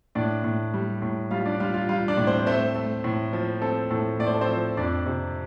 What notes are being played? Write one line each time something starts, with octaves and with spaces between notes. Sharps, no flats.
A2 D4 D5
A2
G3
A2
G3 F4 F5
D4 D5
G3 F4 F5
F4 F5
G3 F4 F5
D4 D5
A2
C4 C5
A3 C4 C5
A3
A2
F3
C4 A4
A2 A4
A2 D5
C5
A4
C4 C5
F3
F2 D4 D5
C3